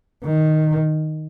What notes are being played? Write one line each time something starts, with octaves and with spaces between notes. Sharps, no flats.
D#3